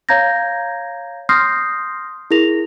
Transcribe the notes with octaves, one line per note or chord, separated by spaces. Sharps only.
C#5 F5 A#5 G6 G#6 A#6
C6 D#6 F6 G6 A#6 C7
E4 G#4 A#4 A#6 F7